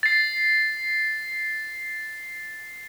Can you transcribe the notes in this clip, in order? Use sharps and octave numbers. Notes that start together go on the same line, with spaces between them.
A6 C7